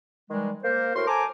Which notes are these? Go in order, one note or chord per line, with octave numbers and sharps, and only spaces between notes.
D#3 E3 G3 G#3
A#3 A#4 C5
A2 F#4 A#4 C5 C6
A4 C5 G#5 A#5 D6